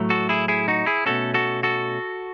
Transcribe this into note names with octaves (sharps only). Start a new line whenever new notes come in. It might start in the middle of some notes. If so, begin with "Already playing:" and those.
Already playing: A2 F#3 A3
F#4 A4
E4 G#4
E4 G#4
D#4 F#4
E4 G#4
B2 A3 C#4 F#4 A4
F#4 A4
F#4 A4